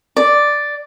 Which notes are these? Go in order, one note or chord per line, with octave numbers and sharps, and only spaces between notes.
D5